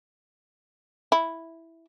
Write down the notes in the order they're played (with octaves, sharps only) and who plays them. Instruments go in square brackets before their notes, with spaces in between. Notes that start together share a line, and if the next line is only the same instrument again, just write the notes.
[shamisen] E4